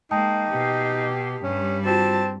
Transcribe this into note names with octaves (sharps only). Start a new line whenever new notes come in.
G#3 A#3 D#4 G5 A5 D#6
B2 G4
G2 G3 C#4
C4 F4 F#4 A5